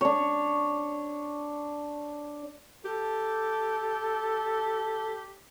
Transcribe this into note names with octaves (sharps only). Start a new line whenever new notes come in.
D4 C#5
G4 A4